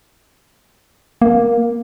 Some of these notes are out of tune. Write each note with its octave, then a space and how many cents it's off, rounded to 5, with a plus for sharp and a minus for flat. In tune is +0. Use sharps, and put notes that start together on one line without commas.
A#3 +10